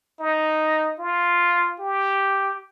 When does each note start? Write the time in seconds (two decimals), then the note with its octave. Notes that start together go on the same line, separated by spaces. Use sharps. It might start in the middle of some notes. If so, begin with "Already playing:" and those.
0.20 D#4
1.00 F4
1.79 G4